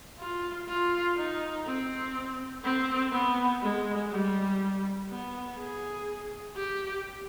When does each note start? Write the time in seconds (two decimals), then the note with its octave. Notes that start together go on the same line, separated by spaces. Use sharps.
0.19 F4
0.68 F4
1.16 D#4
1.66 C4
2.64 C4
3.12 B3
3.62 G#3
4.11 G3
5.09 B3
5.58 G#4
6.56 G4